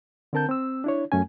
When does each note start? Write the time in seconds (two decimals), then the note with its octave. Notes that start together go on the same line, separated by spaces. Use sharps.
0.33 D3 C4 A#4 A5 G6
0.49 C4 E6
0.84 D4 E4 C#5
1.12 F#2 A3 C#4 G#5